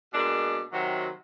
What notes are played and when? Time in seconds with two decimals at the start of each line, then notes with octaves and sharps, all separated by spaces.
0.14 B2 G#3 A#3 D4
0.73 C3 D#3 F#3